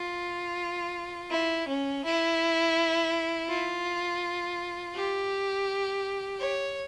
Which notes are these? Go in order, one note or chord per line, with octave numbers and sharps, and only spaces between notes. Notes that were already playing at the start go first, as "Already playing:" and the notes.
Already playing: F4
E4
C#4
E4
F4
G4
C#5